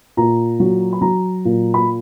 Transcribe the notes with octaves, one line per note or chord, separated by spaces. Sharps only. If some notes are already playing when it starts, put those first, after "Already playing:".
A#2 A#5
F#3
B5
F#3 A#5
A#2
B5